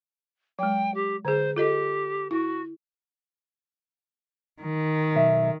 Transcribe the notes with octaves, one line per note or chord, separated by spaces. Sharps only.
F#3 G#3 G5
G4
D3 G#4 C5
F4 G4 A4 D#5
E4 F#4
D#3
B1 E5